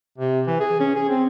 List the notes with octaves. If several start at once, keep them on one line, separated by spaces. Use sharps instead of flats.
C3
E3
G#4
C#4
G#4
C4